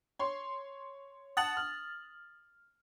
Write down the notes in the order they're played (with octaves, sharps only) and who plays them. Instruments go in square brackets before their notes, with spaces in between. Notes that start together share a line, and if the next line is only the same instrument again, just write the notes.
[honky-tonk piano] C#5 C6
[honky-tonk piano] F#5 A5 [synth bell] D#6 A6 F#7
[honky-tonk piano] F6